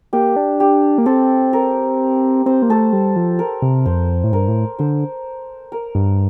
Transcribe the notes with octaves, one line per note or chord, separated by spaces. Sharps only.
A#3 G4
D4
G4
A#3
C4 A4
A#4
C4 C5
A#3
A3 A4
G3
F3
A#4
C3
F2 C5
A2
G2 A#4
A2
D3 C5
A#4
G2